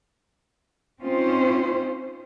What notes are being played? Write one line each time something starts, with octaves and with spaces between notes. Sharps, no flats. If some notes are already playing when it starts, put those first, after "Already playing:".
C4 C#4 D#4 F4 C5